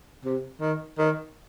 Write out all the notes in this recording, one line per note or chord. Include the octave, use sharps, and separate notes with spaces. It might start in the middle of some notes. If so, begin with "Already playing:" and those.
C3
D#3
D#3